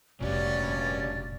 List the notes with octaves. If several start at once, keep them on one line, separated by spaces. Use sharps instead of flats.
F1 E2 G2 A#2 C#4 F#4 G4 D5